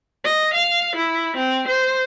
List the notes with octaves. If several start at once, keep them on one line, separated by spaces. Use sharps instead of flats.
D#5
F5
E4
C4
C5